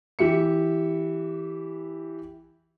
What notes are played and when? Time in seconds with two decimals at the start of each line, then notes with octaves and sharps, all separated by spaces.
0.19 E3 G4 E5 C#7